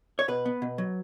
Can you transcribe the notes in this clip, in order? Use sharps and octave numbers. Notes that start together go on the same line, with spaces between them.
C#5
B2 B4
B3
B2
F#3